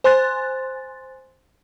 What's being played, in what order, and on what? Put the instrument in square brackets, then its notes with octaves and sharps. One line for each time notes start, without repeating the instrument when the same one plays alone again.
[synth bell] C5 G#5 C6 F#6 A6